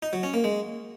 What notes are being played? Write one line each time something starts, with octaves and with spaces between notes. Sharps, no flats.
D#4
F#3
C#4
A#3
G#3